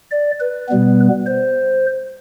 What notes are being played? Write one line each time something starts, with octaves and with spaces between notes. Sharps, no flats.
D5
B4
B2 G3 B3
C5